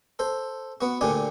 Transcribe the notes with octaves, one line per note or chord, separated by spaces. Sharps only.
A4 C5
B3 F#4
D2 A#2 D3 G4 G#5